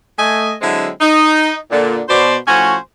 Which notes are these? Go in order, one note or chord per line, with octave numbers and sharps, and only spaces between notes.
A3 D#5 G#5
D3 F#3 G#3 C4 E4
D#4
A#2 D3
B2 C5 D5
A2 F3 C#4 F#4 C5 G#5